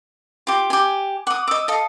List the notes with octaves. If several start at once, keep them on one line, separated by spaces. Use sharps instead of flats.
F4 G4
G4 G#5
F#5 D6 D#6
D#5 D6 E6
A4 D#5 F5